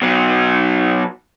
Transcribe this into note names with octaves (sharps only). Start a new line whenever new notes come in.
B2 F#3